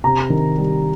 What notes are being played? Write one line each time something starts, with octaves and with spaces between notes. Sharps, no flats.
C3 A#5
D#3
G3